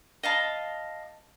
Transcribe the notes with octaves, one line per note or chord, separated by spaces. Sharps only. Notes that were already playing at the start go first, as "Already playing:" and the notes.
D#5 F5 A5 B5